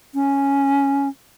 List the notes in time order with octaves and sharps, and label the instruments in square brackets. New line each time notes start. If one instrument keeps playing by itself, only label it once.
[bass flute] C#4